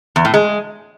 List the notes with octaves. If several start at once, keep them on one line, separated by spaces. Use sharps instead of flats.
E2
A2
G#3